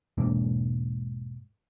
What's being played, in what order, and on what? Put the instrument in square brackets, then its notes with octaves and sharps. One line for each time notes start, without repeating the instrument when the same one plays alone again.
[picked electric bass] E1 G#2 A#3 D4